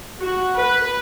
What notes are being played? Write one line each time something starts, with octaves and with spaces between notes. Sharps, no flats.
F#4
B4